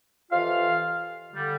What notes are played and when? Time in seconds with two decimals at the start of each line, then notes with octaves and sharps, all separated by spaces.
0.32 F2 C3 E3 F4 F5
1.33 D3 G3